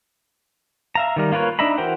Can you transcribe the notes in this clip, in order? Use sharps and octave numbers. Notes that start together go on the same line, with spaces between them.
E5 F5 A#5
D#3 G3 A#4
A#3 F4 A#4 B4 C#5
D4 D#4 E5 A#5 B5
E3 F#4 A#4 C5 G5